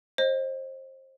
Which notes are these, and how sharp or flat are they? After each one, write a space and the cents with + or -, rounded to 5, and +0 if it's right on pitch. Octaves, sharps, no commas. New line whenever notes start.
C5 +25 D#5 +0